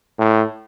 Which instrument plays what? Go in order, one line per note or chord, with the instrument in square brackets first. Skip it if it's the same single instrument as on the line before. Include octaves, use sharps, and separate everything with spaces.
[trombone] A2